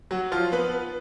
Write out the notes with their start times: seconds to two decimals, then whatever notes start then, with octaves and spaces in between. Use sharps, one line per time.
0.11 F#3 F#4
0.32 F3 F4
0.52 B3 B4